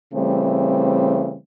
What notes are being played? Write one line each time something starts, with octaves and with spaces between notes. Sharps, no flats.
C#3 E3 G3 A3 C4